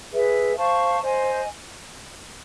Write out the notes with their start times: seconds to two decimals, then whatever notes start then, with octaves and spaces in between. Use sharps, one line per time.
0.11 G#4 B4 E5
0.56 C5 F5 A5 C#6
1.00 C5 D#5 G#5